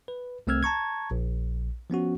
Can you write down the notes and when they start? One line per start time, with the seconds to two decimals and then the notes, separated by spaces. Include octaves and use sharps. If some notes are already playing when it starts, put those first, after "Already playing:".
0.08 B4
0.47 C2 A3 C4 E6 F6 G#6
0.63 A5 A#5 C#6 G#6
1.11 A#1
1.90 F3 B3 C#4 F#4